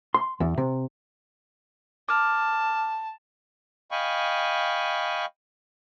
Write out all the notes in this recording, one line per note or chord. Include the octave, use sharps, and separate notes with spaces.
C6
E2
C3
A5 D6 F6
D#5 F5 G5 G#5 B5 C#6